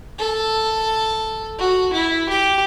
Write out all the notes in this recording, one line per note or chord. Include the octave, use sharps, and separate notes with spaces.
A4
F#4
E4
G4